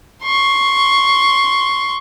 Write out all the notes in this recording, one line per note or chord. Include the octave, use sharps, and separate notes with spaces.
C6 C#6